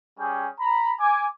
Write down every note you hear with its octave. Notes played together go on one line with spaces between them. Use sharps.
G3 C#4 G#4 G5
A#5 B5
G#5 D6